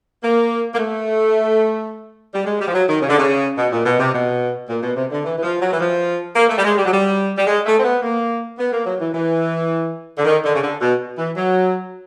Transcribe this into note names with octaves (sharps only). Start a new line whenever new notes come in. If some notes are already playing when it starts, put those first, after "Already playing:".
A#3
A#3
A3
G3
G#3
G3
F3
F#3
D#3
C#3
D3
C#3
B2
A#2
B2
C3
B2
A#2
B2
C3
D3
E3
E3
F3
F#3
E3
F3
A#3
A3
G3
G#3
G3
F#3
G3
G3
G#3
A3
C4
B3
A#3
B3
A#3
F#3
E3
E3
D3
D#3
D3
C#3
D3
B2
E3
F#3